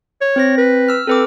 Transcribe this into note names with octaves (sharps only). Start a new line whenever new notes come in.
C#5
C4 C5 A#6
B4
E6 F6
C4 A4 B4 D6